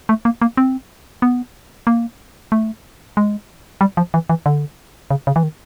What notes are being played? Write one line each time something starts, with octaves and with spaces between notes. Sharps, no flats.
A3
A#3
A#3
C4
B3
A#3
A3
G#3
G3
F3
E3
E3
D3
C#3
C#3
E3
D#3